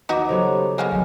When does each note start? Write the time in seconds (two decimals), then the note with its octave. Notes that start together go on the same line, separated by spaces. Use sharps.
0.09 D#2 D#4 F#4 B4 A#5 D6
0.29 C#3 F#3 B3 G4 A4 C5
0.78 G#3 A#3 B3 G5 G#5 F6
0.91 F#3 A3